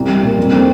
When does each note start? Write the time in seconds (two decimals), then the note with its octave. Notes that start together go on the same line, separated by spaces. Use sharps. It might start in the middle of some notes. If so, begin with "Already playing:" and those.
Already playing: C2
0.09 G3
0.23 A#2
0.37 F2
0.52 C4